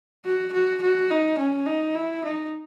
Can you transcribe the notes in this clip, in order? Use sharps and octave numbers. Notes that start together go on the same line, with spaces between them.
F#4
F#4
F#4
D#4
C#4
D#4
E4
D#4